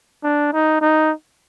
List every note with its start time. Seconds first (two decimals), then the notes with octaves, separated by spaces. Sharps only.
0.23 D4
0.53 D#4
0.81 D#4